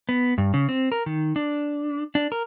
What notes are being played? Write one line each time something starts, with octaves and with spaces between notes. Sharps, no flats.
B3
G2
C#3
C4
A#4
D#3
D4
D4
A#4